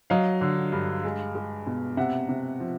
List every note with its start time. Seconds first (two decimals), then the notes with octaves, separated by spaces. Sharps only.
0.10 F#3 D#5 F5
0.41 D3
0.72 G2
1.04 G#3
1.35 G#3
1.67 B2
1.97 C3 E5 F#5
2.29 C3
2.60 F3